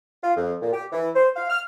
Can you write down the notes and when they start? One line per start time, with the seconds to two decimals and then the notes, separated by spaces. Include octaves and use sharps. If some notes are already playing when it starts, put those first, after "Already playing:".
0.23 F4
0.36 F2
0.62 A#2
0.73 G4
0.92 E3
1.15 C5
1.36 F5
1.50 F6